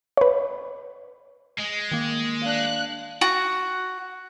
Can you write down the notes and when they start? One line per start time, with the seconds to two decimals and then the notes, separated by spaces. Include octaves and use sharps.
0.17 B4 C#5
1.58 G#3
1.91 D#3 A#3
2.41 D4 F5 F#6
3.21 F#4